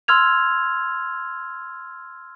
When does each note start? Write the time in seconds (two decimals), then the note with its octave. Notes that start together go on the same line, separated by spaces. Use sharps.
0.08 C6 E6 F6 G#6 F7